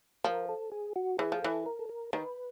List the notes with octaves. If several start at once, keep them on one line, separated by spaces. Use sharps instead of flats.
F3 A#4
A4
G#4
F#4
E3 G#4
F3
E3 A4
A#4
A4
A#4
D#3 B4